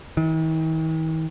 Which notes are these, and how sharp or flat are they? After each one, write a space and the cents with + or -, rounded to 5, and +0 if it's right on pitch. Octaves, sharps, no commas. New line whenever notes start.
D#3 +45